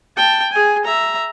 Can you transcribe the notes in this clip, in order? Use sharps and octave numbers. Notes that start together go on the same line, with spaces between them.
G5 A5
G#4 G#5
E5 A#5